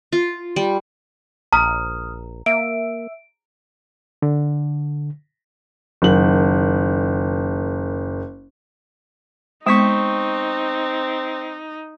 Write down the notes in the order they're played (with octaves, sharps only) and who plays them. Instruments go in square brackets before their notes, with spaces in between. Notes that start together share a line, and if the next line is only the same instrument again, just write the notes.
[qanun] F4
G3
[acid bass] A#1 [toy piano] A#5 [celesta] D#6 F6
[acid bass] A#3 [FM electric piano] E5 [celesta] D7
[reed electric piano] D3
[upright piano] F#1 D#3 F#7
[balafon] G#3 B3 [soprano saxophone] C4 [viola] D#4 [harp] C#6 B6 E7